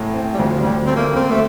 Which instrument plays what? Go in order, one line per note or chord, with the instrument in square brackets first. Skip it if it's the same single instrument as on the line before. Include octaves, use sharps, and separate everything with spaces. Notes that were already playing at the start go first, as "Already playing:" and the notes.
Already playing: [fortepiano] A1 A2
C4
[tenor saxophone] G3
[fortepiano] D2 [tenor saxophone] F3
[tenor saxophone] G3
[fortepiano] D2
[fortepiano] A3 [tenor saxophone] C4
[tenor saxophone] A#3
[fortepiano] D2 [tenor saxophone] C4
[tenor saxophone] A3